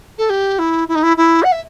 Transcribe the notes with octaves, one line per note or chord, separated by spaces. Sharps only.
A4
G4
E4
E4
D#4
E4
E4
F#5
E5